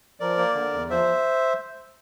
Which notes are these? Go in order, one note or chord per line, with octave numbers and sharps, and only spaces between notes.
F3 A#4 D5
A#3
D3
E2
F3 C5 E5